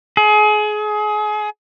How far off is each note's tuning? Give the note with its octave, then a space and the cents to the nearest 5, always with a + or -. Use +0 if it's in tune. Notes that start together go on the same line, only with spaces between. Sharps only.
G#4 +30